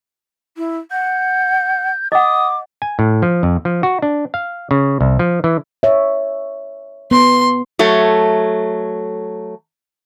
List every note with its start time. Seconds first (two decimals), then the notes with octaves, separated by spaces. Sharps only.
0.57 E4
0.91 F#5 G6
2.12 D#5 F#5 D6 D#6
2.82 G#5
2.99 A2
3.22 F3
3.43 F2
3.65 F3
3.83 F#4
4.02 D4
4.34 F5
4.71 C#3
5.01 C2
5.19 F3
5.44 E3
5.83 C#5 E5
7.11 B3 C6
7.79 F#3 A3